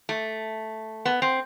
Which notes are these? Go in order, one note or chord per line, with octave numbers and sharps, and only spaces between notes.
A3
B3
C4